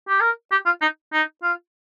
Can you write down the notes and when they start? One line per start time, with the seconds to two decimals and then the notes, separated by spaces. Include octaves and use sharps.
0.08 G4
0.21 A#4
0.51 G4
0.66 F4
0.81 D#4
1.12 D#4
1.43 F4